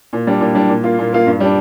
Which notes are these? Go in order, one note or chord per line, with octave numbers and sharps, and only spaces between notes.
A#2
G3 D4
A#2
G3 D4
A#2
A#3 F4
A#2
A#3 F4
G2
G3 D4